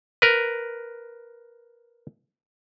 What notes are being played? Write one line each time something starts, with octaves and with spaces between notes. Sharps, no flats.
A#4 B4